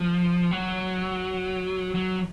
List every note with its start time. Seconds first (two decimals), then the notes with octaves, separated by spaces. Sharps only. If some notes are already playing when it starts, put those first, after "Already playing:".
Already playing: F3
0.51 F#3
1.94 F#3